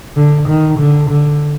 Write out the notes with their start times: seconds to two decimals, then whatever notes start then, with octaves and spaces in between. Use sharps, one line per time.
0.16 D3
0.48 D#3
0.79 D3
1.10 D3